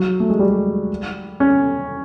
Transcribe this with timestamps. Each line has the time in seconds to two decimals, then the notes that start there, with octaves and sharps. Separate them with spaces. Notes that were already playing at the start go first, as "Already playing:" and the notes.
Already playing: F#3
0.20 A3
0.30 G#3
0.39 G3
1.40 C#4